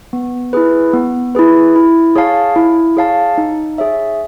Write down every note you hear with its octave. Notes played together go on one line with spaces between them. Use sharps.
B3
E4 G#4 B4
B3
E4 G#4 B4
E4
G#4 C#5 F5 A5
E4
G#4 C#5 F5 A5
D#4
G#4 C#5 E5